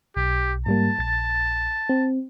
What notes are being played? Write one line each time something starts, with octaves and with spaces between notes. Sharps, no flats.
B1 G4
G#2 G3 A#3 A5
A#1 A6
C4